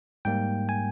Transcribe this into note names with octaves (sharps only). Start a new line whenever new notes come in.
G#2 G3 A#3 G5
G#5